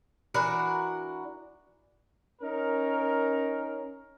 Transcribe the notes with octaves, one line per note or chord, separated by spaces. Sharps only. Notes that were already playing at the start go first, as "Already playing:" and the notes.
E3 D4 F#4 A#4
C#4 D#4 A#4